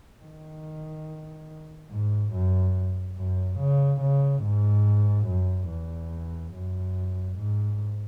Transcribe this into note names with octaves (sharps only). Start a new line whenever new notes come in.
D#3
G#2
F#2
F#2
C#3
C#3
G#2
F#2
E2
F#2
G#2